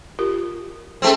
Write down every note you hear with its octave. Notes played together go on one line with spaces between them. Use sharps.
F4 G4 A#4
A3 C4 C#4 G#4 C5